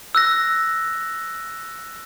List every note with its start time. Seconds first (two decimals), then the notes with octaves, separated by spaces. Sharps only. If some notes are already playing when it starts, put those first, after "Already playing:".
0.15 E6 F#6 A#6